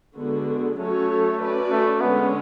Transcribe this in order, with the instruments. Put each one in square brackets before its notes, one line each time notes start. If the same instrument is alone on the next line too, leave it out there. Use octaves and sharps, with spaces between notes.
[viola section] D3 G#3 B3 F#4
[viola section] F#3 C#4 F#4 A4 C#5 [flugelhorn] A3
[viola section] C#4 F#4 B4 D5
[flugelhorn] A3
[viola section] D3 G#3 C#4 [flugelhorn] B3